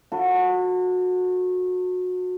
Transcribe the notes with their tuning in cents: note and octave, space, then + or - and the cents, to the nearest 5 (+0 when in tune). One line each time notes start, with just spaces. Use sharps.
F#4 -25 A4 +35